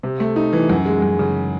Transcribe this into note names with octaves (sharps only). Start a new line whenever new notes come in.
C3
A3
D#4
E3
F#2
G#3
F#2
C#3